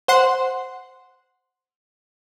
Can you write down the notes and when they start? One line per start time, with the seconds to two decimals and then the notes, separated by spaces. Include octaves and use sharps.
0.08 C5 F#5 C6